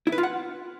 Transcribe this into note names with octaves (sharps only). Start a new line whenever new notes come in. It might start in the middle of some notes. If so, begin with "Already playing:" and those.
E4
B4
F4
F#5